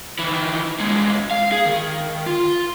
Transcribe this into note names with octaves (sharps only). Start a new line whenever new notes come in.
D#3 E3
C2 G#3
F5
G#4
D#3
F4